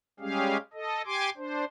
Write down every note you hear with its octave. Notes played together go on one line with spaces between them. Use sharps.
G3 G#3 C#4 G4 G#4 F5
A4 D#5
G4 G#5 C6 D6
D4 C5